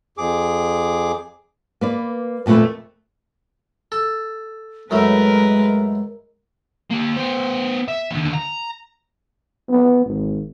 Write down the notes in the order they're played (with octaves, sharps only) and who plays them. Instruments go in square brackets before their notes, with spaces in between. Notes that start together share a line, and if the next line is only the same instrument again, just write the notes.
[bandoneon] F2 G#4 D6
[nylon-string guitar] A#3 B4 D5
F2 A#2 F#3 A3 B4
[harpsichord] A4
[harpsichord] F#2 A2 A3 [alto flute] G#3 [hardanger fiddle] A#4 B4
[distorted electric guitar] A#3 G4
B3 C5
E5
D#2 D3
A#5
[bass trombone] B3
G#1